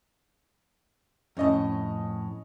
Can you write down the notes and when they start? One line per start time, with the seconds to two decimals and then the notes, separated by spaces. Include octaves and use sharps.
1.37 F2 A2 C#4 D#5